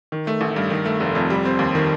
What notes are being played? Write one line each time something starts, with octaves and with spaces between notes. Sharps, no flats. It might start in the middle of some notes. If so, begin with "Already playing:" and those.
D#3
A3
A1
G2
D#3
A3
F1
F2
G3
C4
D#2
D#3